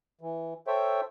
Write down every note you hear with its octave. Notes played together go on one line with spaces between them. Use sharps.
E3
A4 C5 C#5 E5 G5